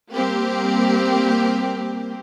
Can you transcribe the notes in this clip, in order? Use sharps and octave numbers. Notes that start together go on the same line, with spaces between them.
G3 A#3 C4 G4